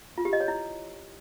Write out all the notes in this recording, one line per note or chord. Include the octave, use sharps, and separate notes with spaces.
F4
G4
D#5
C#5
E4